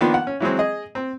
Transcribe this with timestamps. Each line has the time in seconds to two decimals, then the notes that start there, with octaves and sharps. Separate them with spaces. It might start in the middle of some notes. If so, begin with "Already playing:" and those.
0.01 D#3 F3 A#3 B3 D4 F4
0.14 F#5
0.27 C#4
0.41 E3 F#3 G#3 C4
0.59 G#4 D#5
0.95 C4